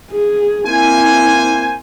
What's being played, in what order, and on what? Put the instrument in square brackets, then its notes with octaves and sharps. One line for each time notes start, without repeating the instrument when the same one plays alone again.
[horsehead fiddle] G#4
[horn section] A#3 C5 G#5 [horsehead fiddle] C4 E4